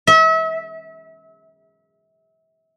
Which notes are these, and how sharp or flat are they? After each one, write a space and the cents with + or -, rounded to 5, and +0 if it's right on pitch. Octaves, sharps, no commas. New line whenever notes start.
E5 -35